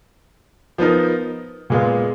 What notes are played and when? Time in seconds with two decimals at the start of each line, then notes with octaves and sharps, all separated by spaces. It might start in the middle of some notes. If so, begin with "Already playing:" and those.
0.78 F3 B3 D#4 A#4
1.70 A#2 G#3 B3 F4